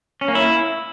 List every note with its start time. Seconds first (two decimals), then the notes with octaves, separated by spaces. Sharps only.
0.21 C#4
0.28 A#3
0.35 E4